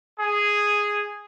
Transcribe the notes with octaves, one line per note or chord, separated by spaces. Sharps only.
G#4